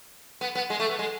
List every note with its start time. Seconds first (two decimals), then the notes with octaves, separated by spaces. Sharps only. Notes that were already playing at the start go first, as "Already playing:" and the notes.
0.41 B3
0.55 B3
0.70 G#3
0.80 A3
0.89 B3
0.99 G#3